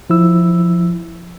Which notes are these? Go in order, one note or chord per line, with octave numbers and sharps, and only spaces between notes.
F3 E4 E6